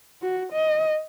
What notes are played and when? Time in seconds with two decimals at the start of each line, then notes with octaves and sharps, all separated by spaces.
0.22 F#4
0.53 D#5